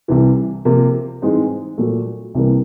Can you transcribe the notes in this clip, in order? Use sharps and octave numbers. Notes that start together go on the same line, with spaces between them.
C2 C3 E3
C3 F3 A#3
G#2 E3 G#3 C4 D#4
A#2 F#3 A3
C2 C3 E3 G3 A#3